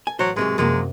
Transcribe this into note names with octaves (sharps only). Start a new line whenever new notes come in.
A4 G#5
A1 F#3 C5 D#7
G#2 C3 F#3 G#3 A#4 E5 B5
F#2 C3 F3 F#3 G#3 A#3